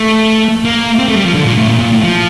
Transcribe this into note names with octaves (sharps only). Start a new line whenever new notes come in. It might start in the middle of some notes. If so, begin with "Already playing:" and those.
Already playing: A3
A#3
C4
A3
G3
F3
D3
A#2
A2
A#2
A#2
A2
F3